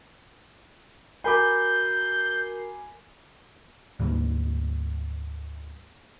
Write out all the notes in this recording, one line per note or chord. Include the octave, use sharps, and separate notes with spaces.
F#4 A#4 G#5 B5 D6 G6 C7
D2 G#2 G3 A#3